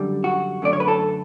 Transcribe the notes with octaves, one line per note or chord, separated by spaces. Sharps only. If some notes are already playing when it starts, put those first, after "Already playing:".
Already playing: F#2 D3 G3
F#4
F#2 D3 A3 D5
C#5
B4
A4